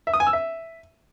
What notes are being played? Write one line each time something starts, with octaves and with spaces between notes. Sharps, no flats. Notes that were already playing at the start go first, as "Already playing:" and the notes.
E5
D#6
G#5
E6
E5